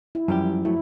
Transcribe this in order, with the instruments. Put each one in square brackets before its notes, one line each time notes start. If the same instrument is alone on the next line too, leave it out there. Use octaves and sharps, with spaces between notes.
[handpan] E4
[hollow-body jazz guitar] F#2 G3 G4 [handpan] F3
[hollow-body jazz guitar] F#3 A3 [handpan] E4